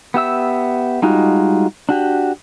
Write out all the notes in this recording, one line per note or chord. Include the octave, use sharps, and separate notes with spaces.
B3 G4 E5 E6
G3 G#3 D#4 F4 F#4
D4 F#4 G4